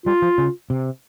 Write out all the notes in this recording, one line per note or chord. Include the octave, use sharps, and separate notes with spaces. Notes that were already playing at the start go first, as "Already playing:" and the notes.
G3 F4
F3
C#3
C3